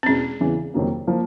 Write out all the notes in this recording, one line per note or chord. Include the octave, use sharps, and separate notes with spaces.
C4
E2 B2 G#3 C#4
E2 C#3 E3
F2 C3 D#3 F#3 A#3
F3 A#3